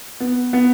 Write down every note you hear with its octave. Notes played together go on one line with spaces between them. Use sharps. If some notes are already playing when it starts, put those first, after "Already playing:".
B3
B3